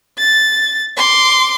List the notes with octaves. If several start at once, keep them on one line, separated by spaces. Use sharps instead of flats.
A6
C6 D6